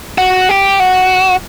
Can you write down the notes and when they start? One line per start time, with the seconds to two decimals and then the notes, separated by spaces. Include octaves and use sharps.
0.18 F#4
0.49 G4
0.80 F#4